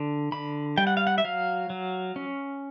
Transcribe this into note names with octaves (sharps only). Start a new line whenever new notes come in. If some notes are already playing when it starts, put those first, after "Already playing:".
Already playing: D3
D3 B5
G3 G5
F#5
F5
F#5
E5
F#3 F5
F#3
C#4